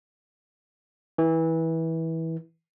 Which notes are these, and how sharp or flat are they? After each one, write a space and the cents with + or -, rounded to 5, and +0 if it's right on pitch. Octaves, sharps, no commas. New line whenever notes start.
E3 -20